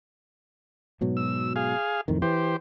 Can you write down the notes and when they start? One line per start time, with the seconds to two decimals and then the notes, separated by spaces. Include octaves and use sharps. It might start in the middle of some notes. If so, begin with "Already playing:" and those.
1.01 G#2 B2 F#3
1.17 E6
1.56 G#4 F5
2.08 F2 A2 D#3
2.22 E3 G4 C5